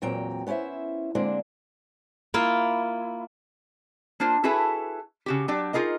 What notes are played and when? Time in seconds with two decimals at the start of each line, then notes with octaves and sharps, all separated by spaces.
0.02 E2 A#2 F#3 C4 G5 A#5
0.47 B3 C#4 E4 C5 E5
1.15 D3 G#3 A#3 C4 D4
2.34 A#3 E4 F4
4.20 A#3 D4 F4 C5
4.44 E4 F#4 G#4 A4 B4 E5
5.26 C#3 F#4 G4
5.48 F#3 D4 G4 D5
5.73 D#4 F4 G#4 A#4 D#5